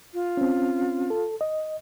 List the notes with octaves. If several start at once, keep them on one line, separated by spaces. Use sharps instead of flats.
F4
C4 C#4
A4
D#5